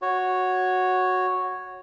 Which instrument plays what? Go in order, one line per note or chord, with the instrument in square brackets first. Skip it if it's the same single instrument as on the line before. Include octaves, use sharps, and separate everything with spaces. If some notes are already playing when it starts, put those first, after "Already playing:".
[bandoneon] F#4 C#5